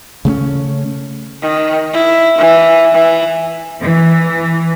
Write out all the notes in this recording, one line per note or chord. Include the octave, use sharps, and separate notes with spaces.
C#3 A3 B3 C#4
D#3
E4
E3
E3
E3